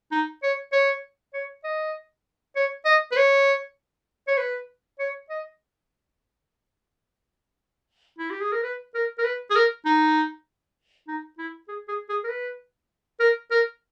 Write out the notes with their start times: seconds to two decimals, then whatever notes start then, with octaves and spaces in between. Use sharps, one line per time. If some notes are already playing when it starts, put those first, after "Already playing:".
0.12 D#4
0.43 C#5
0.72 C#5
1.34 C#5
1.64 D#5
2.56 C#5
2.86 D#5
3.12 B4
3.17 C#5
4.28 C#5
4.37 B4
4.99 C#5
5.30 D#5
8.19 E4
8.30 G4
8.41 G#4
8.52 A#4
8.63 B4
8.95 A#4
9.18 A#4
9.24 B4
9.50 G#4
9.55 A#4
9.85 D#4
11.08 D#4
11.38 E4
11.68 G#4
11.88 G#4
12.09 G#4
12.24 A#4
12.29 B4
13.20 A#4
13.51 A#4